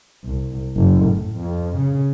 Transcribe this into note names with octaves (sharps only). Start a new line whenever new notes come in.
C2
F#1
A2
F2
C#3